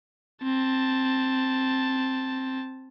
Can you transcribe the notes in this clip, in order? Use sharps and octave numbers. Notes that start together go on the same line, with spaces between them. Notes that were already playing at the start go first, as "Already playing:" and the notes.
C4 A5